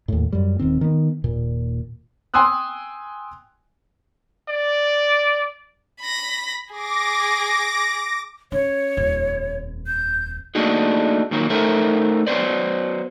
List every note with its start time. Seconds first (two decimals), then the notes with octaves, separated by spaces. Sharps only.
0.08 D#2 A2
0.32 F#2 G3
0.59 D#1 D#3 C4
0.81 D#3 B3
1.24 D#1 A#2
2.34 G5 G#5 C6 D#6 E6 F#6
4.49 D5
6.01 B5 A#6
6.72 G#4 D6 A#6
8.52 C#4 C#5
8.97 D#1 F2
9.87 G6
10.55 A3 A#3 D4 D#4 F#4 G#4
11.31 A#2 D#3 F#3 A#3
11.50 A3 D#4 A4 A#4 C5 E5
12.27 F#3 B3 B4 C5 D5